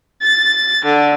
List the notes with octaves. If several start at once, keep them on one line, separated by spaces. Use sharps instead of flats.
A6
D3